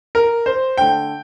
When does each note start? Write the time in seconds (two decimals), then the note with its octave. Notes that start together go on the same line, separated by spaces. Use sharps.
0.15 A#4
0.46 C5
0.78 D3 A3 G5